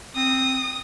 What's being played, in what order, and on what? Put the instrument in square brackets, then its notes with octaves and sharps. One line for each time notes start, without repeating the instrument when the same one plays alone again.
[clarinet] C4 [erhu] D#6